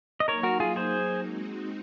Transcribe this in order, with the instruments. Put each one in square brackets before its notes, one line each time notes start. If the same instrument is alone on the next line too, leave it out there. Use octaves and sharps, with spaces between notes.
[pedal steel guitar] D#5
[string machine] F#3 A#3 D#4 [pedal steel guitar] A#4 C#5
[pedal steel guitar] F#4 A#4
F4 G#4
G#4 C5
[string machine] G#3 C4 D#4 F#4